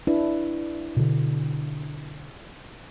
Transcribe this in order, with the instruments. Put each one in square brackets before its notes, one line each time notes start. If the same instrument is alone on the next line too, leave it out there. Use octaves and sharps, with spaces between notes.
[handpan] D4 E4 B4
[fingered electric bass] B2 D3